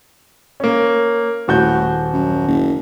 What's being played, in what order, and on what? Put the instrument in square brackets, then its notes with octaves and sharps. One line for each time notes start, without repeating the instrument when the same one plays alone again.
[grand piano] A#3 C#4
[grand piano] D#1 F#4 G6 [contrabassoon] A2
[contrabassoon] F#2
F#1